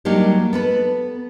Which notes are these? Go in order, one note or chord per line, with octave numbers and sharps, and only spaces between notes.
F#3 G3 A#3 D4 D#4 G4
B3 A4 B4